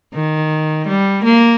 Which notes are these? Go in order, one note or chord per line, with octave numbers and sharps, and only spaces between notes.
D#3
G3
A#3